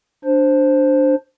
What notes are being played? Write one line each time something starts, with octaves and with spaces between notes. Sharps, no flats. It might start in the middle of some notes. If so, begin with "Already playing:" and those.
D4 C5